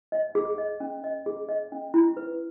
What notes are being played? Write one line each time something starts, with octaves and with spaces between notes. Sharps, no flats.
D#5
G#4
D#5
C#4
D#5
G#4
D#5
C#4
E4
B4